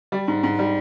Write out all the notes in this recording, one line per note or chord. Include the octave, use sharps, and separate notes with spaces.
G3 D5
G#2
G#2
G3